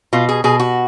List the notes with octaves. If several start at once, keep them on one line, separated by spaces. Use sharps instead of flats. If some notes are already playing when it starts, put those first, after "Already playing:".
B2 F4
G#4
B2 G#4
F#4